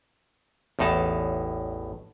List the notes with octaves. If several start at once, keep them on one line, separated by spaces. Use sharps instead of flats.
A1 E2 A2 D#4 A5